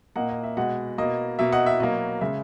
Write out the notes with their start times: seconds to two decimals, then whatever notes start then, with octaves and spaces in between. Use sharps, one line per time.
0.16 A#2 A#3 D#5 F#5
0.30 D#5
0.44 E5
0.57 B2 G#3 D#5 F#5
0.98 B2 A#3 D#5
1.39 B2 A#3 E5
1.52 D#5 F#5
1.66 E5
1.80 B2 F#3 A#3 D#5
2.21 C#3 G#3 E5